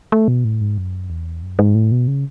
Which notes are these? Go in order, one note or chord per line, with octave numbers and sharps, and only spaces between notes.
A3
B2
A2
G#2
F#2
E2
F#2
G#2
A2
B2
C#3